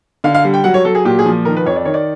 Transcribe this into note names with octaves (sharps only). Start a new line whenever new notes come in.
D3 F5
F5
G3
G5
F#3 F#5
C#5
F#3 A4
G#4
A#2 G4
G#4
F3
D#3 A#4
B4
F2 C#5
D5
D#3 C#5
D5